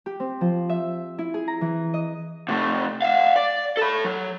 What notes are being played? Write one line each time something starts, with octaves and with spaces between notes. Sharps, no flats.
G4
C4
F3
E5
E4
G#4
A#5
E3
D#5
C3 A3
E5 F5
D5
A4 B5
F#3